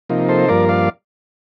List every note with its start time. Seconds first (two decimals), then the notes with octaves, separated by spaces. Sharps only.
0.09 C3 F3 A#3 D#4
0.28 A4 C5
0.48 G2 F3 A#3 A#4 D5
0.69 D5 F5